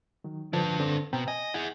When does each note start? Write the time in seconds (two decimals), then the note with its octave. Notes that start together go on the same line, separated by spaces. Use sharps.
0.24 D#3 F#3
0.53 D3 F3 D4 B4 A5
0.80 D3 C4 A4
1.13 B2 C4 G5 A#5
1.28 D#5 G#5
1.54 E4 G#4 F#5